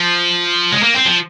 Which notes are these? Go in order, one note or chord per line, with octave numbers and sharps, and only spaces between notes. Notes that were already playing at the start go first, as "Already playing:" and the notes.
Already playing: F3
G#3
A#3
C4
F3